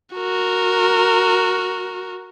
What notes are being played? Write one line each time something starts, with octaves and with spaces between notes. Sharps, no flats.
F#4 A#4